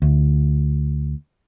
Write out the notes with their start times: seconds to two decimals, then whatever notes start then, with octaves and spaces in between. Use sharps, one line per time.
0.02 D2